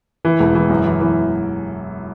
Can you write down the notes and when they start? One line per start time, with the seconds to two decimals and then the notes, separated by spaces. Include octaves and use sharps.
0.25 E3
0.40 E1
0.55 E3
0.70 F#2
0.86 E3
1.01 E3